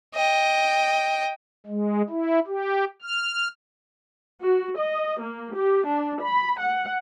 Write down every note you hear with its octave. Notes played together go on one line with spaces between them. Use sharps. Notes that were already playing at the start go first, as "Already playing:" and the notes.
D#5 G5
G#3
E4
G4
F6
F#4
D#5
A#3
G4
D4
B5
F#5